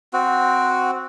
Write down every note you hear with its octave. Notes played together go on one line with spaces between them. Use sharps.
C4 F#4